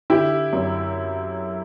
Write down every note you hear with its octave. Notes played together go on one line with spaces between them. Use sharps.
D3 E4 G4
F#2